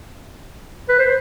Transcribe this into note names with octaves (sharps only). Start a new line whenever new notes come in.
B4
C5